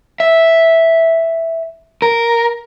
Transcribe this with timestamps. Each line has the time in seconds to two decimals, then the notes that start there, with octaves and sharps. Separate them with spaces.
0.20 E5
2.02 A#4